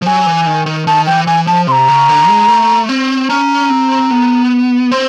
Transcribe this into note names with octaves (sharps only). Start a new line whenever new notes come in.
F3
F#3 G#5
E3
D#3
D#3
D#3 A5
E3 G5
E3 G#5
F3 A5
C3 A#5 C6
C#3
D3
G#3
A3
C4
C#4 A#5
C4
B3
C4 C6